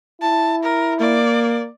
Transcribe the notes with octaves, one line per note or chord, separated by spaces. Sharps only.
E4 A5
A#4
A#3 D5